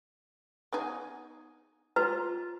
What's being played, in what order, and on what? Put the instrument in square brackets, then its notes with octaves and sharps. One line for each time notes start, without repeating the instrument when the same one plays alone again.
[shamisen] B3 D#4 G#4
[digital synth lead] F4 [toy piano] B4 [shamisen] A#5